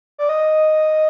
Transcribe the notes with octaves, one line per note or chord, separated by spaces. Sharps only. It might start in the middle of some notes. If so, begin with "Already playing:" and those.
D5
D#5